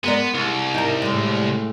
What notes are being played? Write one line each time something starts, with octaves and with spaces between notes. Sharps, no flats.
G#3 B3 A#4 D5
C2
D#4 A#4
A2 G#3